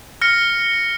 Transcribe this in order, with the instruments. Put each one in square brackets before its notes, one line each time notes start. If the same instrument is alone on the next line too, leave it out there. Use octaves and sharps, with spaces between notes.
[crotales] F6 A#6 C#7